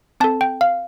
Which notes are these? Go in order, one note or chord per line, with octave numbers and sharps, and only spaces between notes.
C4 A4 A5
G5
F5